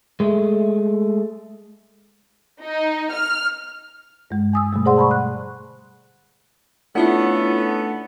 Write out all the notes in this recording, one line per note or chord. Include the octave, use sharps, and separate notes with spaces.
G#3 A3
D#4
F6
G2 G#3
G#5 D#6 E6
B2 D3 G3 A3
G#4 C5 D5 F#5 C6
A5 B5 C#6
F#6
A3 B3 C#4 D4 E4 F4 A4 F#5